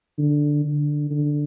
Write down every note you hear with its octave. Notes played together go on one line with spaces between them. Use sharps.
D3
D3
D3